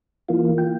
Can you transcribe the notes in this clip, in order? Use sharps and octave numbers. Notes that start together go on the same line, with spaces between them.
E3 A#3 F4
G5